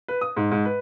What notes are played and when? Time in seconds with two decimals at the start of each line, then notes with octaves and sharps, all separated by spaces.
0.08 B4
0.21 D#6
0.37 G#2
0.51 G#2
0.65 B4